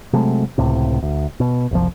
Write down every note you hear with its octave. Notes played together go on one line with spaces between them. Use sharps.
C3 F#3 G#3 A3
C#2 A2 C3
D2
B2
F#1 C2 F3